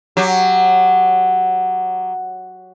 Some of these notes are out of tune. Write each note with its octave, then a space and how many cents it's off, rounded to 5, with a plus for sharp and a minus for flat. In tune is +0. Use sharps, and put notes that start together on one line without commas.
F#3 +0 G4 +15